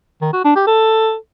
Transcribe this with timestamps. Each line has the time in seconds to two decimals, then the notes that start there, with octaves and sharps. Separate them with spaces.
0.22 D#3
0.33 F#4
0.44 D4
0.56 G4
0.67 A4